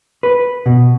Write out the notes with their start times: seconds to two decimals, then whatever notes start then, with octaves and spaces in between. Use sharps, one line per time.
0.23 B4
0.66 B2